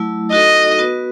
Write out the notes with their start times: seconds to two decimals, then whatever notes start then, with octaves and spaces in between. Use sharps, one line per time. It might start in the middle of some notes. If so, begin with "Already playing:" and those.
Already playing: F#3 A3 E4
0.31 D#4 F#4 A4 D#5
0.78 B3 F#4 B4